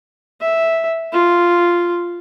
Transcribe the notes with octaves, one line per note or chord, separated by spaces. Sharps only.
E5
F4